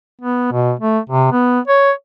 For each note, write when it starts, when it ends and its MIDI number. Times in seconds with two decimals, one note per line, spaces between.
0.21 0.50 59
0.52 0.73 47
0.80 0.99 57
1.09 1.30 48
1.32 1.60 59
1.67 1.91 73